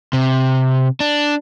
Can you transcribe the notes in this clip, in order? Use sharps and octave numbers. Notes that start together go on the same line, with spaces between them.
C3
D4